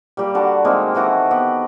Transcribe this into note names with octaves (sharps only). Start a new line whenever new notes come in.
G3 A#3 G4
D3 G3 F#4 A5
D#3 G#3 A#3 C4
D#3 E3 F#4 A4
B3 F#4 G4